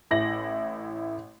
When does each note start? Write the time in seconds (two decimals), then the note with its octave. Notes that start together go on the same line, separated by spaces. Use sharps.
0.11 A1 E4 A#6 F#7